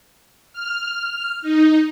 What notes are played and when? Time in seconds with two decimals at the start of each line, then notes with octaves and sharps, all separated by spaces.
0.53 F6
1.42 D#4